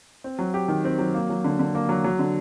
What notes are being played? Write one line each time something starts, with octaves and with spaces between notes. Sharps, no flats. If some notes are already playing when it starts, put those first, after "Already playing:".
C4
F#3
G4
D#3
C4
F#3
A#3
F#3
D3
D3
A#3
F#3
F#3
D3